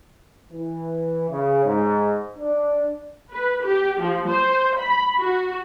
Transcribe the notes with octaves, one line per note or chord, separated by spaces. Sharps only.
E3
C#3
G#2
D4
B4
G4
F3
C5
B5
F#4